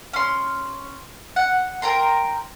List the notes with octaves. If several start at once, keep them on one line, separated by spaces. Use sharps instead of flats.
C#4 C6
F#5
A#4 G5 A#5 C6